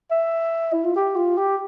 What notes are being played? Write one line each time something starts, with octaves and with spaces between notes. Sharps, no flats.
E5
E4
F4
G4
F4
G4